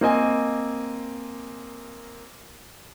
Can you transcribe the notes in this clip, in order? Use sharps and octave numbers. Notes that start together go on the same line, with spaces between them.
A#3 C4 D#5 G#5